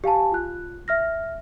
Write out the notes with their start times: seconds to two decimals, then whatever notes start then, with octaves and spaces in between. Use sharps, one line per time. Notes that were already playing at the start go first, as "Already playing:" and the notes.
0.04 G4 F5 G#5 A5
0.32 F4 F#6
0.88 E5 F6 A#6